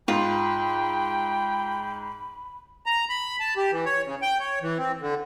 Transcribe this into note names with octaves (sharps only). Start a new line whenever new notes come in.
G#2 F4 G5 B5
A#5
B5
A5
G4
E3
C#5
C#3
G5
C#5
E3
C4
D3